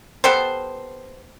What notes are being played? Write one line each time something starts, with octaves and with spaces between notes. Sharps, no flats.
B3 G4 A4 C5